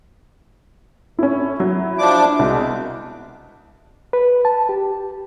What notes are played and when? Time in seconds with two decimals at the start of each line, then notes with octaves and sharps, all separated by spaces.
1.19 A2 C#4 E4
1.60 F#3 E4
1.98 F3 D4 D6
2.39 C2 B2 G#3
4.13 B4
4.45 A5
4.69 G4